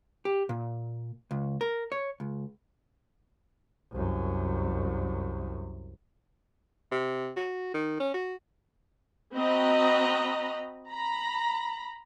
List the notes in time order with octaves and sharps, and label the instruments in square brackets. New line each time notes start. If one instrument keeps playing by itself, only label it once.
[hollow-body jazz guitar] G4
A#2
C#2
A#4
C#5
C#2
[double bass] C2 F#2
[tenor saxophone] C3
F#4
D#3
C#4
F#4
[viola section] C4 F#4 D#5 A#5 B5
A#5 B5